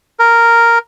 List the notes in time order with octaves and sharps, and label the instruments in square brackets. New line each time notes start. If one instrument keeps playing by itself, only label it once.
[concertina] A#4